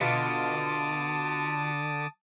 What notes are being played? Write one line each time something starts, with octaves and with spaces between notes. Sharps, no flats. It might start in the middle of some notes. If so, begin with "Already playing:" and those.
B2 D3 F4 A5 D6 D#6